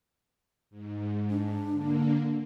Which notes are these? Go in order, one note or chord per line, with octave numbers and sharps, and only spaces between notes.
G#2
D4
D3 A#3